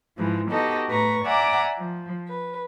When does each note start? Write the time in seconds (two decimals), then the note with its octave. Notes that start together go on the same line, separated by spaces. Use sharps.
0.17 G#2 E3 F3 G#3
0.49 B3 D#4 F#4 G4 A4 D#5
0.87 A2 B4 A#5 C#6
1.25 D5 E5 F#5 G#5 A#5 D6
1.78 F3
2.29 B4